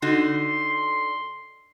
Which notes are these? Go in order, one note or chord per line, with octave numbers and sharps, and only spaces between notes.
D3 D#4 F#4 C6